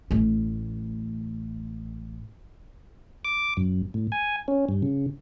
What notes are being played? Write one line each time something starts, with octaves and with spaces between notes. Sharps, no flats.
A1 A3
D6
F#2
A2
G#5
C#4
G2
C#3